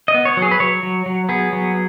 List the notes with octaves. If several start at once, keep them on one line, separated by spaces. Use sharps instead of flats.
D#5
B3
C#5
F#3
G#4
B4
F#3 C#5
F#3
F#3
B3 G#4
F#3